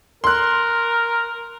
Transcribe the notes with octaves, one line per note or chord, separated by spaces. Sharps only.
A#4 C6 F#6